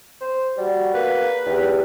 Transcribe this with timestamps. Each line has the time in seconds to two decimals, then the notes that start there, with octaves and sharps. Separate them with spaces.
0.21 C5
0.57 G3 F#4
0.94 A#3 B4
1.46 E2 G4